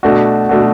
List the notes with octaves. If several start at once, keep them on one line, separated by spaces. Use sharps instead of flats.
B2 A3 D4 F#4
B2 A3 D4 F#4